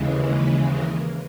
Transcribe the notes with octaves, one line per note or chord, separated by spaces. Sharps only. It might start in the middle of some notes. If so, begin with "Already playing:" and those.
Already playing: D#2 C#3 E3 G#3
B4
A#4